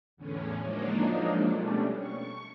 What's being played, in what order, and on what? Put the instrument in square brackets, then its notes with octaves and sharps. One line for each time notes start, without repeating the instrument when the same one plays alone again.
[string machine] E2 A2 D3 C#4
F3 F#3 G#3 A#3 D4 D#4
B2 G3 A3 C#4 D4
C#6